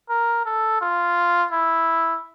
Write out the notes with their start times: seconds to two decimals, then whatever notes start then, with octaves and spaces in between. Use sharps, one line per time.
0.09 A#4
0.45 A4
0.81 F4
1.52 E4